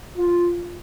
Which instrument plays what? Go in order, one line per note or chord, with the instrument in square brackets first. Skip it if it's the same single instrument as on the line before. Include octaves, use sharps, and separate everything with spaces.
[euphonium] F4